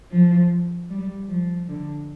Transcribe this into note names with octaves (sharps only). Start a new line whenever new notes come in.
F3
G3
F3
D3